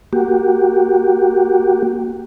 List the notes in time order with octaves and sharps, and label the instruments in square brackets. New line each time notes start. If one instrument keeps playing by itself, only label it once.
[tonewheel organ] A#3 F#4 G4